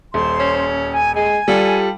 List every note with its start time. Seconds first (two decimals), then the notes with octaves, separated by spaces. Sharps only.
0.14 D#1 C5 C6
0.40 C#4
0.93 G#5
1.15 G#3 G#5
1.48 G3 F4 A4